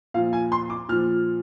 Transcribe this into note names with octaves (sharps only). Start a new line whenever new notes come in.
A#2 F3 F5
G#5
C6
D6
A#2 F3 F6